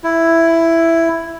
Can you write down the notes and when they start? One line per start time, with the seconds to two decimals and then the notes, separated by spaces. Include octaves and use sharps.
0.04 E4